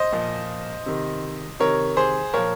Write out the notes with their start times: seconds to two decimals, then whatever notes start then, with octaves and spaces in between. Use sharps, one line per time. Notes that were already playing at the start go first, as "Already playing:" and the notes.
Already playing: C5 D#5
0.13 A#2 F3
0.86 C3 D#3
1.60 C3 D#3 A#4 C#5
1.97 G#4 C5
2.34 A#2 F3 A#4 C#5